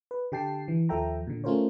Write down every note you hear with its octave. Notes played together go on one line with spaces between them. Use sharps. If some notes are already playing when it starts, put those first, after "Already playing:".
B4
D3 G4 G5 A5 C7
E3
D#2 F3 A4 E5 G5 A#5
A#2 D3
A3 C#4 F4 A#4 C5 C#5